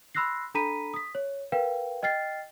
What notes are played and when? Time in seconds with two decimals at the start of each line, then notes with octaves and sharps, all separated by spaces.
0.15 B5 C6 E6 F#6 A#6 C7
0.55 D4 A4 A#5 B5 B6 D#7
0.94 D#6 B6
1.15 C#5
1.52 A#4 B4 F5 G5
2.03 D#5 G5 F6 A6 C7